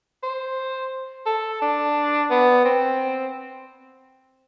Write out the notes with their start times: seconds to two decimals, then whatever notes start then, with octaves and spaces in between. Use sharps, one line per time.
0.23 C5
1.26 A4
1.61 D4
2.31 B3
2.65 C4